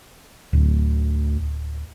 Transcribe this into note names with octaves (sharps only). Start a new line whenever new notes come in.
D1 D2